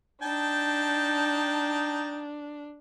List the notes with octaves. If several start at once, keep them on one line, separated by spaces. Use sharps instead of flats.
D4 D#4 G5 A5